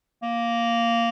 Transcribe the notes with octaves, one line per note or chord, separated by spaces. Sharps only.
A#3